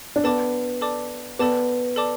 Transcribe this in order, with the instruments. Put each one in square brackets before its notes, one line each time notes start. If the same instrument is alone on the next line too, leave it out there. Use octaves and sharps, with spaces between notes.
[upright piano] D4
[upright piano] B3 [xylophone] A4 D5 A5 D6
[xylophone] A4 D5 A5 D6
[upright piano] B3 [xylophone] A4 D5 A5 D6
[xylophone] A4 D5 A5 D6